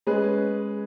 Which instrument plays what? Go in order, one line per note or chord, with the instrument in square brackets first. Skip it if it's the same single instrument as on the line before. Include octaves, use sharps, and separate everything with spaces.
[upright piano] G#3 C#4 G#4 B4